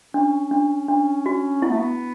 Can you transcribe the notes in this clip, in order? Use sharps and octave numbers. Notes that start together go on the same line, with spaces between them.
C#4 D4
D4
D4
F#4
B3 E4
A3
B3